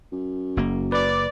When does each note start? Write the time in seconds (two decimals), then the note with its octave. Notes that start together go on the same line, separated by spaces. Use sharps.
0.12 F#2
0.57 F#1 A#3
0.92 B4 D5